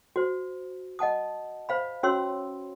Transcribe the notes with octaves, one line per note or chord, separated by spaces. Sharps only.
F#4 C5
D#5 F#5 A5 D#6
C5 F5 B5
C#4 F#4 C#5 C6 E6